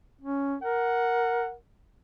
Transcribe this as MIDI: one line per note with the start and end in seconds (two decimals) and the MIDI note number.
0.21 0.56 61
0.62 1.54 70
0.62 1.53 78